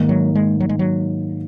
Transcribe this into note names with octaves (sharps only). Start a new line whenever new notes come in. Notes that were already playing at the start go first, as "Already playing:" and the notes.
Already playing: G#2 D#3 A#3 D#4
F#3
G#3
F#3
G#3
F#3